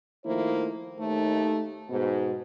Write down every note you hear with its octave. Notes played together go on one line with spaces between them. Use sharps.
D#3 F3 A3 A#3 E4 C5
D#2 A3 D#4
G#2 B2